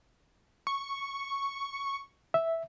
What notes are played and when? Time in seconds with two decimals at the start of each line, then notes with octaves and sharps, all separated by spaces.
0.67 C#6
2.34 E5